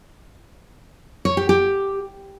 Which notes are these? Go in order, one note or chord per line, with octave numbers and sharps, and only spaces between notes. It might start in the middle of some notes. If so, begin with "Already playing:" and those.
C#5
G4
G4